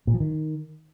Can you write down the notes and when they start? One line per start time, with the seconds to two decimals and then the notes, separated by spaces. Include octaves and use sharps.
0.07 A#2
0.14 F3
0.20 D#3